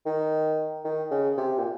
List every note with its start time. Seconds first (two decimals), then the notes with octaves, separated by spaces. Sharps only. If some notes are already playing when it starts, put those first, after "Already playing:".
0.06 D#3
0.85 D#3
1.11 C#3
1.38 C3
1.59 A#2